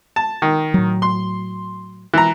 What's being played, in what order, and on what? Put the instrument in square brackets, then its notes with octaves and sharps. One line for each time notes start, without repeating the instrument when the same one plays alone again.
[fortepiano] A5
D#3
[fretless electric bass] A2 F#3
[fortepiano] C6
E3 A#5